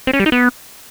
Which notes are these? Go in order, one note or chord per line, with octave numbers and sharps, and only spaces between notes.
C4
C#4
G3
D#4
B3